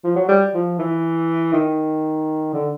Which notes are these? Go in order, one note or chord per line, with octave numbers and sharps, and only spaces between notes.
F3
F#3
G3
F3
E3
D#3
D3